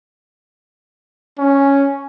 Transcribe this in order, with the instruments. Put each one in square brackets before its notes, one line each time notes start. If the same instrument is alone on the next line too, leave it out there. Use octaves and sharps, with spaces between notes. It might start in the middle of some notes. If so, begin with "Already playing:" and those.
[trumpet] C#4